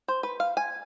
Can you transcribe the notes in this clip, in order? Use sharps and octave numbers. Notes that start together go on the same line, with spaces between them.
C5
B4
F5
G#5